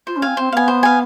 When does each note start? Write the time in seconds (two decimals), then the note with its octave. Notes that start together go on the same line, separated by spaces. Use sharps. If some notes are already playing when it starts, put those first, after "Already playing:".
0.07 F4 C5
0.16 C#4
0.22 C4 F5 G#5
0.37 C4 C5
0.52 B3 F5 G#5
0.68 C5
0.83 F5 G#5